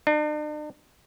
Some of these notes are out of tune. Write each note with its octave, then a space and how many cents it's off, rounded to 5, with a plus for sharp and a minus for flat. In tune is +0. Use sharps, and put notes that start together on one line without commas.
D4 +45